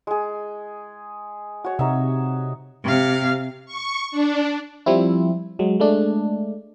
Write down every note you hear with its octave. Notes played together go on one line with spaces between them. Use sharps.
G#3 G#4
F#4 C#5
C3 D#4 F#4 E5
C3 F5
C#6
D4
F3 G3 C4 E4
F#3 G#3
G#3 A3 D4